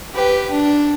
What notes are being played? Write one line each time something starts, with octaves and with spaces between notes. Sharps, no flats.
G4 B4
D4